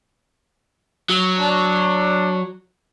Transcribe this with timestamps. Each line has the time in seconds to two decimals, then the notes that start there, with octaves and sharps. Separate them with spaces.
1.09 F#3
1.39 D4